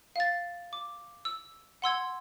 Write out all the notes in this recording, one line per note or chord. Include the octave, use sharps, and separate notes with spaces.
F5 A6
D6
E6
F#5 C6 E6 G#6